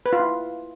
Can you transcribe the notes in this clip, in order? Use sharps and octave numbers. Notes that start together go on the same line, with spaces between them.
B4
F4
E4